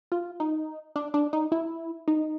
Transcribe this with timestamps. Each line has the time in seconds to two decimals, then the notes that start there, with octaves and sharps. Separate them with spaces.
0.12 F4
0.40 D#4
0.96 D4
1.14 D4
1.33 D#4
1.52 E4
2.08 D#4